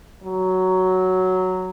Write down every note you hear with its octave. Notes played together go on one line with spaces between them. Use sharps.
F#3